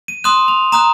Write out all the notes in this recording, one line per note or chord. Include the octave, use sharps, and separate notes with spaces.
D#7
C6 D#6 F#6 E7
F7
A#5 D#6 F#6 E7